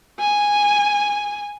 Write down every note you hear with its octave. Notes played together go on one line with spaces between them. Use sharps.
G#5